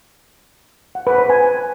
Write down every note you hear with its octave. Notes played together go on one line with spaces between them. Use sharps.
F#5
B4
C5
G#5